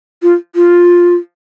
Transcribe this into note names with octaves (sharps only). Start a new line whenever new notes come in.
F4
F4